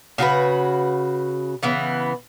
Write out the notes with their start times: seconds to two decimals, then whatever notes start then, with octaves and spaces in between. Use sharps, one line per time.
0.18 C#3 F#4 G#4 B4
1.63 C#3 E3 B3